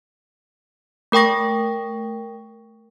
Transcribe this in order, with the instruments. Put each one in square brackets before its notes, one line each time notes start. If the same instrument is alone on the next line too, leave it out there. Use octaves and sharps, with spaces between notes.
[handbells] A3 A#4 G5 C#6 A#6